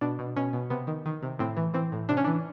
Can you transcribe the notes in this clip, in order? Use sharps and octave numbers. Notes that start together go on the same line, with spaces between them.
B2 D4
B2
B2 C#4
B2
C3 B3
D#3
D#3
C3
A2 C4
E3
E3 C4
A2
C3 D4
C#4
E3 D4